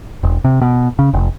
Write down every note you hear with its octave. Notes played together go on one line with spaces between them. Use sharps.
E1
C3
B2
C#3
F1